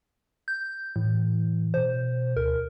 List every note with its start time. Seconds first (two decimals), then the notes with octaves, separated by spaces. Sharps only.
0.48 G6
0.96 A2 E3
1.74 B2 C5
2.37 D2 A#4